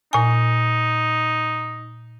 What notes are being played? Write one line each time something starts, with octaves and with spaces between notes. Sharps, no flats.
A#2 D#4 G#5